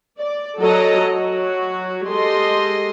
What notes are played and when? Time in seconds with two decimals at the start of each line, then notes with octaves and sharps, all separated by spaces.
0.18 D5
0.59 F#3 A4 D#5 A#5
1.14 F#3 F#4
2.06 G#3 G4 A4 D#5 C6